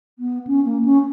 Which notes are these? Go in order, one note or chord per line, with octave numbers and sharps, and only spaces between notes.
B3
C#4
A#3
C#4